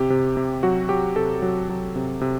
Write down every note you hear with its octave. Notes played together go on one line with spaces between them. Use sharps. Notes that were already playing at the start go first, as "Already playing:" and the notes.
Already playing: C3 G4
C3
C3
F#3 F#4
F#3 G4
C3 A4
F#3
F#3
C3
C3